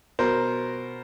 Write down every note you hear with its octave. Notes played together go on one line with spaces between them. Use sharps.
B2 A#4 C5